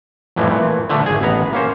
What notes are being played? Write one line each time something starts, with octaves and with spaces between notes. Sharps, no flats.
F2 A2 E3 F3 G3
A#2 E3 A3
D3 F3 A3
G#1 G#4
A1 B3 A#5
A#3 C#4 C5